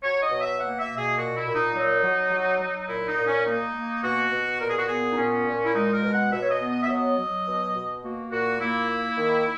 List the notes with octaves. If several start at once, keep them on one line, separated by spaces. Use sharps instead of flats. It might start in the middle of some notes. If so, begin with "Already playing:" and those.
F#3 C#5
D#5
B2
E5
A#3 F#5
E5
B2
G#4
A#2 F#4
E4
A#2
D#4
F#3 D#4
F#3
F#3
F#3
A#2 E4
D#4
A#2
C#4
A#3 D#4
A#3
B2 F#4
B2
A#2 A#4
G#4
F#4
B3 G#4
D#4
A#2 C#4
A#2
E4
G#3 D#4
A#4
B2
F#5
B2 E5
C#5
D#5
B3
D#5
E5
F#3 D#5
F#3
B2
B2
A#3 F#4
A#2 F#4
A#3 E4
A#3
D#3